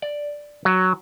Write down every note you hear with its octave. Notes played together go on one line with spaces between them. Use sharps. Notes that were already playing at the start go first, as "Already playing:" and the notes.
D5
F#3